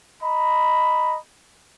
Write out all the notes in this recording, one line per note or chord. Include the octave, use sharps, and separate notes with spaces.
D#5 A#5 B5